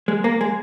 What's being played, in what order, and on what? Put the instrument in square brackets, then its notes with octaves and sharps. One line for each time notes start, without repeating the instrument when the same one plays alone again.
[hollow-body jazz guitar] G#3
A#3
G#3